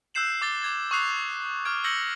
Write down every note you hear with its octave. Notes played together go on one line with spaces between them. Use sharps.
E6 F#6 G6 C7 E7 F#7
D6 A6 G7
D6 G#6 A6
C#6 D#6 F#6 C7 F7
D6 F6 G#6 D7
E6 G6 G#6 A#6 C#7 F#7